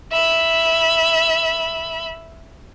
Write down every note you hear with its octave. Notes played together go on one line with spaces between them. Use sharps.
E5 B5